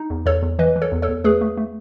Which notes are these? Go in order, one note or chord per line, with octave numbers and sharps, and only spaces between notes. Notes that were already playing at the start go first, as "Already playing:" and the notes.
Already playing: D#4
E2
E2 A4 C#5
E2
E3 B4 D#5
E3
A4 C#5
E2
A4 C#5
E2
A3 G#4 B4
A3
A3